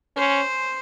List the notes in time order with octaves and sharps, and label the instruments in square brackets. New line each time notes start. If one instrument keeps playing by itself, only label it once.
[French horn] C#4 [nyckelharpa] C5